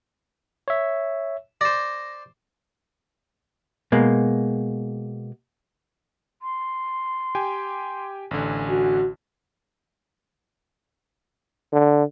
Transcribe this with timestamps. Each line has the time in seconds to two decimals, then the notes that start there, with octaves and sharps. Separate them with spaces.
0.68 C#5 E5
1.61 C5 D5 A#6
3.92 B2 G#3 A#3
6.42 C6
7.35 G4 G5 G#5
8.31 A1 D3 G#5
8.70 F#4
11.73 D3